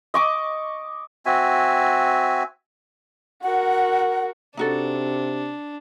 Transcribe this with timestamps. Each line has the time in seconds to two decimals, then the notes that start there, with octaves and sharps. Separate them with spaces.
0.14 D#5 C#6 D6
1.26 C4 F#4 E5 G#5
3.43 F#4 A#4 F#5
4.57 C3 D4 D#4 F#4 A4